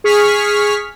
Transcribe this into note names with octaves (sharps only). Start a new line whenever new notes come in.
G#4 C#6 F6 B6